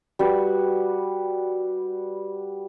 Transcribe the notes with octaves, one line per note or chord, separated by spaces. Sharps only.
G3 F#4 B4